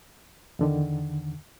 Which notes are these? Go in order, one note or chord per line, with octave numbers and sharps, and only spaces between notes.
E2 D3 D#3